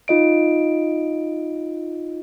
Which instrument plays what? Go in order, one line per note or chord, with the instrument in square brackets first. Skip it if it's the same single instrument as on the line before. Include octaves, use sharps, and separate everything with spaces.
[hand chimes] D#4 F4 D#5 D7